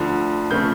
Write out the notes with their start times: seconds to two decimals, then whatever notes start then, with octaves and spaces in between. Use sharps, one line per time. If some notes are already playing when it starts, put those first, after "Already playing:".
Already playing: D2 D3 F3
0.51 C#3 F3 A3 C4 G6